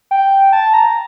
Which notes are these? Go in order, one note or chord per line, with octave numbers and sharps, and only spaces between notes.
G5
A5
A#5